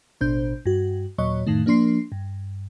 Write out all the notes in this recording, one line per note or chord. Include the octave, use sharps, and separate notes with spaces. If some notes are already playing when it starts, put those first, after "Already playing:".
A1 B2 D4 C5 G6
G2 F#4
D#2 A#2 F#3 C#5 D#5 C#6
F2 A2 D#3 A3
F3 A#3 D4 C6 C7
G2